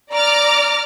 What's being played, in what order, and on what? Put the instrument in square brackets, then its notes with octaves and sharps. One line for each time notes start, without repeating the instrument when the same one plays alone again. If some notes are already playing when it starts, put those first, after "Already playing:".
[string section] D5 A#5 D6 F6